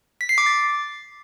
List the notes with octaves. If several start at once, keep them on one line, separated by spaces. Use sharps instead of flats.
B6
C7
D6
A6